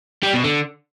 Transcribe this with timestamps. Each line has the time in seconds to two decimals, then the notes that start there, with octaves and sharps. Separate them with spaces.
0.23 G3
0.33 B2
0.44 D3